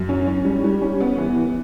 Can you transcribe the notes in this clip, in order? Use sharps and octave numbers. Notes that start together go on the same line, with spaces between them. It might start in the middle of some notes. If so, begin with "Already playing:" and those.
Already playing: F#2
C#4
C#4
G3
G3
C#4
B3
E3
E3